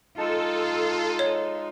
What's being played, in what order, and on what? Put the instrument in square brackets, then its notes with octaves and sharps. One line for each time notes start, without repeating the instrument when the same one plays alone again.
[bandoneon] G#3 D#4 [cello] F4 [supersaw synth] A4
[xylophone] C#5